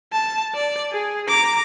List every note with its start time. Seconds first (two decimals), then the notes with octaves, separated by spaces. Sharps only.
0.13 A5
0.55 D5
0.92 G#4
1.28 A#5 D6